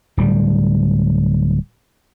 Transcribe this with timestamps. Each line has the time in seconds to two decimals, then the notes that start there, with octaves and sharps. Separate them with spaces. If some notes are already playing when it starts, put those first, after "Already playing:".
0.17 D1 G3